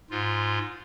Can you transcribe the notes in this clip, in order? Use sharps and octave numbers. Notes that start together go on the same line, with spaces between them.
G#2 F4